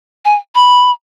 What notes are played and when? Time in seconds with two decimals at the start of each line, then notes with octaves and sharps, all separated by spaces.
0.25 G#5
0.55 B5